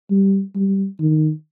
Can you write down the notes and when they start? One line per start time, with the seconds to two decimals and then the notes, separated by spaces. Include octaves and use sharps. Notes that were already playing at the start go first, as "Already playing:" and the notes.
0.10 G3
0.55 G3
1.00 D#3